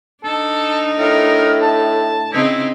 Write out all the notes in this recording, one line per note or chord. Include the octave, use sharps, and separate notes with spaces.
D4 D#4 A4
A2 A#4
A5
C#3 C4 D#4 E4